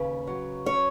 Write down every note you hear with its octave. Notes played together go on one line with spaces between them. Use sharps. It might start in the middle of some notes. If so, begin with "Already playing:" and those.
Already playing: D#2 C#3 B4
F#3
C#4 C#5